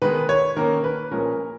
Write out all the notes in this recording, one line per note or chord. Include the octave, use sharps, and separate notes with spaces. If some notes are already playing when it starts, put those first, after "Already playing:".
D#3 G#3 B3 B4
C#5
D#3 A#3 C#4 A#4
B4
A#2 F3 G#3 C#4 A#4